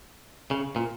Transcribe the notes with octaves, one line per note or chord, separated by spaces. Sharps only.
C#3
A#2